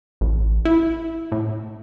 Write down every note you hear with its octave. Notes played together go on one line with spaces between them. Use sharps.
A1
E4
A2